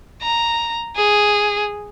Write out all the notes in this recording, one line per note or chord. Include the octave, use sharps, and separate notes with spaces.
A#5
G#4